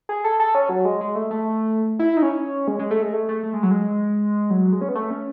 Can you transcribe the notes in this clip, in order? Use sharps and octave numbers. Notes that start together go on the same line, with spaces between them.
G#4
A4
A4
C#4
F#3
G#3
G#3
A3
A3
E4
D#4
C#4
G#3
G#3
A3
G#3
A3
A3
A3
G#3
F#3
G#3
F#3
G#3
C#4
B3
A3
C#4